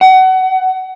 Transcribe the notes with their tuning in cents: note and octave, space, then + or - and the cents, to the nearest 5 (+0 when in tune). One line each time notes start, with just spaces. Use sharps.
F#5 +25